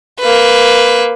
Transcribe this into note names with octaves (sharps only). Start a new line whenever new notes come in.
A#3 B4